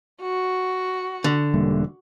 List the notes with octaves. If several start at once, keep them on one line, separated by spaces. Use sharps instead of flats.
F#4
D3
E1 G3 A#3